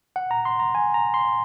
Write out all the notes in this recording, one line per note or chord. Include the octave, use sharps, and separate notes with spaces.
F#5
A#5
C6
A#5
G#5
A#5
C6